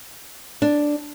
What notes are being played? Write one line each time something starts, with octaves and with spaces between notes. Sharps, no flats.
D4